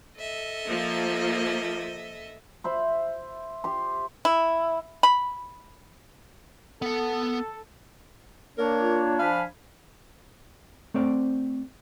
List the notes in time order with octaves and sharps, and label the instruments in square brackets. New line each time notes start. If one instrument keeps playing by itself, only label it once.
[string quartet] A4 D#5 E5
[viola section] F3 A#3
[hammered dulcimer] C5 E5 B5
G4 C6
[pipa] E4
B5
[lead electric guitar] B3 F#5 [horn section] A4
[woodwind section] A#3 C#5 [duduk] D4 [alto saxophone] A#4
[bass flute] F4
[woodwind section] F3 G#5 B5 [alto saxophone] F5
[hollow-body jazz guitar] A3 C4 C5 D5